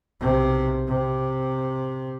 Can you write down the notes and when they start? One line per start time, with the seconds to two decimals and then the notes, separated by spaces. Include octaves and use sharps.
0.21 B1 C3
0.87 C3